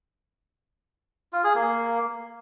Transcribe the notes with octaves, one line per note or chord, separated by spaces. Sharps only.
F4
G#4
A#3